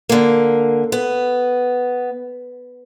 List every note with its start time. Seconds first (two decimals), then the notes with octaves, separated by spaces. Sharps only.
0.09 D3 A#3
0.92 B3